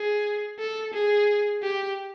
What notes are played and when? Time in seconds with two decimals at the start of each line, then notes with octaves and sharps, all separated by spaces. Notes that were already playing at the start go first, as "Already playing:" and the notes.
Already playing: G#4
0.59 A4
0.94 G#4
1.63 G4